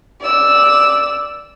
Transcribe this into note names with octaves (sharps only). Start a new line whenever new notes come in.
D5 E6